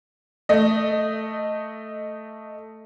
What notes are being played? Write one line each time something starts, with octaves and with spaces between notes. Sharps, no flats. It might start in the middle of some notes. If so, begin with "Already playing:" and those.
A3 D#5